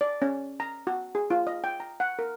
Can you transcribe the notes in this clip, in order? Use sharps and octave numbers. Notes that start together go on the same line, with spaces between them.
D5
C#4
A#5
F#4
G#4
F4
D#5
G5
A#5
F#5
A#4